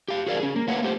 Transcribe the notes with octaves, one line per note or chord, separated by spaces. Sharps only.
G4 F5
F#4 G#4 A#4 D5 F5
C#4 G#4
A#3
A3 A#3 B4 C#5 F5 F#5
A3 G4 C5